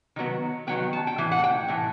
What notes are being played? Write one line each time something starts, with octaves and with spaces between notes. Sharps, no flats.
D#3 F#3 B3
D#3 F#3 B3 G5
A5
G5
A2 E3
F#5
G5
A2 E3